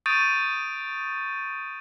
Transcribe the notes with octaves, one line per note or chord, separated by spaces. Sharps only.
C#6 D#6 G6 A6 D7 D#7